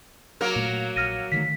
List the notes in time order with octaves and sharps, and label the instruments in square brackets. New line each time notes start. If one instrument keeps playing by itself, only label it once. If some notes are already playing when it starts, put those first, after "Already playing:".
[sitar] F#3 A#3 A#4
[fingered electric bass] A#2 A3
[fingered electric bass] A#1 [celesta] F6 A#6 D#7
[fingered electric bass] D3 D#3 A3 [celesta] B6